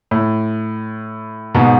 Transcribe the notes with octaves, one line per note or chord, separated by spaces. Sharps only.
A2
G#2 B2